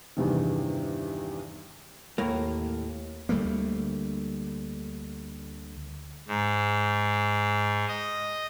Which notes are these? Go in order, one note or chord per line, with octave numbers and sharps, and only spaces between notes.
E2 G2 C3 D#3
D#2 A2 A#3
D2 G3 A3 A#3
G#2
D#5